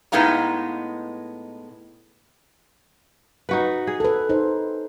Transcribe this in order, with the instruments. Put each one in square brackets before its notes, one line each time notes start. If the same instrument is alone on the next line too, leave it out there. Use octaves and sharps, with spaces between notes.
[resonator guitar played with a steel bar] A2 G#3 B3 D#4 F5 A#5
[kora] D#4 F#4 B4
G#4
[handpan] A4 B4
D#4 C5